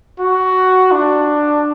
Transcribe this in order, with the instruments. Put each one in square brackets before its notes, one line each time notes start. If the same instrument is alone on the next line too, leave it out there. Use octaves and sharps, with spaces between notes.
[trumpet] F#4
D4